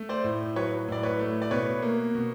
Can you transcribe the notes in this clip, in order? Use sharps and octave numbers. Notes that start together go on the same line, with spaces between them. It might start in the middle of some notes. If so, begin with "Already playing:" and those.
Already playing: A3
C5 D5
A2
F#3 B4 C#5
A2 D5
B4 C#5
A3
D5
B2 B4 C#5
A#3
B2